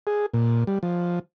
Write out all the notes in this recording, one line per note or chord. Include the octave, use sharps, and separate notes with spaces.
G#4
A#2
G3
F3